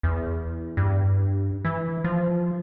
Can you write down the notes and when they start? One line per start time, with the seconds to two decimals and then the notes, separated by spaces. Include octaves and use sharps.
0.03 E2
0.77 G2
1.65 E3
2.04 F3